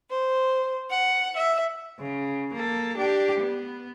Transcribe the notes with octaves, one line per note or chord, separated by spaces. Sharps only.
C5
F#5
E5
C#3
A#3 A4
D4 G4
B3